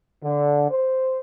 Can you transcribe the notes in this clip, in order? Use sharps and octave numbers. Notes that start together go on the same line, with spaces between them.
D3
C5